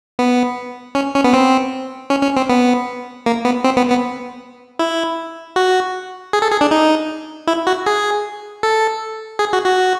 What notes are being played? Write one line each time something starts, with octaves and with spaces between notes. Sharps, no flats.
B3
C#4
C#4
B3
C4
C#4
C#4
C4
B3
A#3
B3
C4
B3
B3
E4
F#4
G#4
A4
G#4
D4
D#4
E4
F#4
G#4
A4
G#4
F#4
F#4